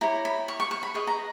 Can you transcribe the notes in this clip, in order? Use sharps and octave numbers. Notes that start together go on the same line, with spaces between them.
E4 G4 C#5 A#5
B5
C#6
C#6
C#6
B5
G#4 B4 D#5 C#6
A#5